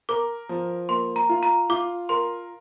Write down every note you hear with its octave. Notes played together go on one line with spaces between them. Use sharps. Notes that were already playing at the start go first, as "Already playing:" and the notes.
A#4 D6
F3
A#3 C6
A#5
F4
A#5
F4 D6
A#4 C6